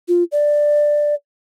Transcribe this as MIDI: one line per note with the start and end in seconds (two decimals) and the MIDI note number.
0.08 0.24 65
0.32 1.15 74